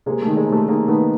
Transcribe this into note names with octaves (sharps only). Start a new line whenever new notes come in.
C3 G#3 A#3
D#3 A3
G#3
C3
A3
D#3 G#3 A#3
D#3 A3 B3